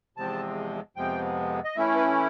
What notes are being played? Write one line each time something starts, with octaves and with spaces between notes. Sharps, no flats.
E2 C3 F3 G#3 C4 A5
F2 C3 F3 G#3 B3 G5
D#5
E3 A3 C#4 E4 E5
B4